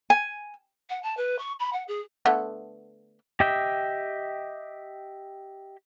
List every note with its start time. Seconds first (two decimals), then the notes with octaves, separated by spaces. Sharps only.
0.10 G#5
0.89 F#5
1.03 A5
1.17 B4
1.39 C#6
1.60 B5
1.73 F#5
1.88 G#4
2.26 D3 A3 B3
3.40 G4 D#5 E5 G5